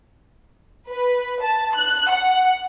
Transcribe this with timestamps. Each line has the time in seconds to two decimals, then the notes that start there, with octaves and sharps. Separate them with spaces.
0.90 B4
1.43 A5
1.76 F#6
2.11 F#5